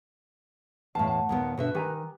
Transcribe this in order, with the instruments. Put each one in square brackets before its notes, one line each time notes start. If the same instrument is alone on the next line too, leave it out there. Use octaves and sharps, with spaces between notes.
[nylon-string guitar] E2 A2 [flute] D#5 [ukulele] F5 A5
[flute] F#5 [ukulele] A5
[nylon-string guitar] D#2 A#2 B3
[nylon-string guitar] B2 D3 E5 [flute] B4
[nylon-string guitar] D#3 [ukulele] G4 G#5 A#5